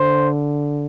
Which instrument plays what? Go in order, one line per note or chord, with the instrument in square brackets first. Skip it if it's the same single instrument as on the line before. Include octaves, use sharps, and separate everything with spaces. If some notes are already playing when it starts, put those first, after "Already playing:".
Already playing: [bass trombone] D3 [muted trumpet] C5